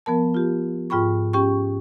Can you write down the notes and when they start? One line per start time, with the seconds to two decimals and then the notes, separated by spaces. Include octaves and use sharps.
0.06 F3 B3 A#4 A5
0.34 F4 G4
0.90 G#2 F4 G5 B5 C#6
1.33 C#4 G4 G5 C#6